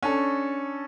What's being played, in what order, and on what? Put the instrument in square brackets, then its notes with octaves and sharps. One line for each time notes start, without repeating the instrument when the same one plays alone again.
[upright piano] C#4 D4 A4